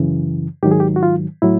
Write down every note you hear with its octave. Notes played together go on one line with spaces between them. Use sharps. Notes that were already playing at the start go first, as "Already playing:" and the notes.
Already playing: F#2 C#3 E3
G#2 D#3 F#3 G4
G#4
G4
F#4
F4
A2 F#3 E4